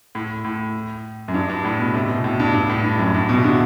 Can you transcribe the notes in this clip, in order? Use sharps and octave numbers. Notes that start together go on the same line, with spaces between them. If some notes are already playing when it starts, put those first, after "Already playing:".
A2
A2
F#2
G2
G2
A2
B2
C3
B2
A2
G2
G2
A2
G2
F#2
G2
B2
C3
D3